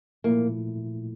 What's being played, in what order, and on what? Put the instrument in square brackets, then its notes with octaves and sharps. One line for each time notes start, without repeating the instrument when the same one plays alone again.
[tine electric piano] A#2 F3 A3 E4 [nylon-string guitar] A#3